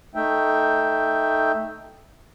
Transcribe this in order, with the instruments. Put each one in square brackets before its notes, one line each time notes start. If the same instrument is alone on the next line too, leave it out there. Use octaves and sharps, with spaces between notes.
[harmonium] A3 D#4 E5 G5